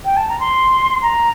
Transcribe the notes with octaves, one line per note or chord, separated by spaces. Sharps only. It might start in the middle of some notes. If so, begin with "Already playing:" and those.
G5
A5
A#5
C6
A#5